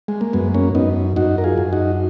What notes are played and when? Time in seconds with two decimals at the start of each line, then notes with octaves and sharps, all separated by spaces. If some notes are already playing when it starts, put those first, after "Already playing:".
0.08 G#3
0.21 A#3
0.33 F#2 G#3 B3
0.54 A#3 C#4
0.75 F#2 B3 D#4
1.16 F#2 D#4 F#4
1.38 A#4
1.44 F4 G#4
1.58 F#2
1.73 D#4 F#4